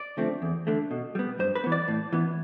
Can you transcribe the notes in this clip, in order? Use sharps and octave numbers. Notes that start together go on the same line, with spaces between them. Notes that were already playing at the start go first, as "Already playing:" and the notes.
Already playing: D5
D3 F3 A3 C4
E2
D3 A3
B2
G3 B3
G2 C5
B4
E3 B3
D5
A2
E3 B3